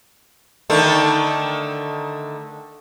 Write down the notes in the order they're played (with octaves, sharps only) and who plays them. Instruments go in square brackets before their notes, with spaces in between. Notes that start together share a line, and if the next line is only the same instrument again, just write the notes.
[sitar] D3 D#3 A3